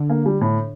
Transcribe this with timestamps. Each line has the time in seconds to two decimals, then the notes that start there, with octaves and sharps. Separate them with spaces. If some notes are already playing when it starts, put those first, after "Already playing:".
Already playing: D3
0.10 A#3
0.26 G3
0.41 A2